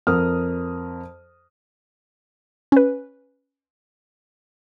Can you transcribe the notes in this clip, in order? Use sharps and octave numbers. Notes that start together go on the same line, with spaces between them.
F2 A#4 D#6 F6
C#4 B4